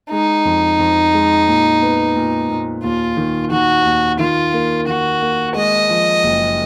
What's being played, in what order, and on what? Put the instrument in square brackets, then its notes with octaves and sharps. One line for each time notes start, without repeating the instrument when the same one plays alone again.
[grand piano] G#3 [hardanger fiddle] D#4
[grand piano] F2
F2
G#3
A#2
B3
A#2
A#2
[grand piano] D#2 [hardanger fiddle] F4
[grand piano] D#3
[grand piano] D#3 [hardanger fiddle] F#4
[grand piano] D#2
[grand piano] D#3 [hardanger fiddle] F4
[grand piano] A#3
[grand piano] D#3 [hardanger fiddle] F#4
[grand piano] A#3
[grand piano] G#3 [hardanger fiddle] D#5
[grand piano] F3
F#1